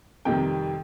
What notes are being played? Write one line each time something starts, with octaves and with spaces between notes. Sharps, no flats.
F2 C3 D#3 G3 G5